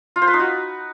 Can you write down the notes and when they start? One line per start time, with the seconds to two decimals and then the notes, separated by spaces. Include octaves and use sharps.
0.16 F4
0.22 C5
0.28 B4
0.34 D#4
0.40 F#4